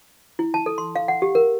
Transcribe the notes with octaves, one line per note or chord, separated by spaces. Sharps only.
E4
A5
A4
C6
F5
F#5
G4
A#4